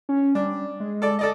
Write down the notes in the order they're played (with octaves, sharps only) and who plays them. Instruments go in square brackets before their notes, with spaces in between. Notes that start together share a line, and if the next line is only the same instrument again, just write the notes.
[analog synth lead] C#4
[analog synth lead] G3 [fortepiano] D4
[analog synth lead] G#3
[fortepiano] A4 D5
A4 D5 D#5